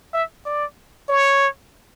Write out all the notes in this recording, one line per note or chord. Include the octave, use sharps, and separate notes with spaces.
E5
D5
C#5